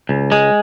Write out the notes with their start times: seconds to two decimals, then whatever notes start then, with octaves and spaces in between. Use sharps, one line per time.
0.09 C#2
0.32 G#3